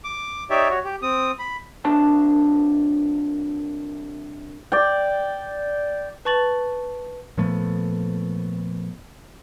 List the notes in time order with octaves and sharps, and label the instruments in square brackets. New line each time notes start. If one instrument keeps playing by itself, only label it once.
[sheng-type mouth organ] D6
D#4 G4 C#5 D5 E5
F#4 C#5
G4
C4 D#6
B5
[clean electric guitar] C2 D4 C5 A5
[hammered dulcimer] D5 G5
[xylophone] B4 A5 C#6 A6 F#7
[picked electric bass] A#2 F3 A3 B3